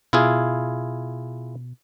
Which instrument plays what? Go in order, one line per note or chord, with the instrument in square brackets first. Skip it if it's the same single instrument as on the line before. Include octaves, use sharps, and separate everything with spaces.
[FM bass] B2 [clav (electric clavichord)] E4 F4 G#4